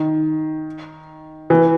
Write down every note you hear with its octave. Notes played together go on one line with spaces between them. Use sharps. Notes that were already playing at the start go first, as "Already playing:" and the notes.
Already playing: D#3
E3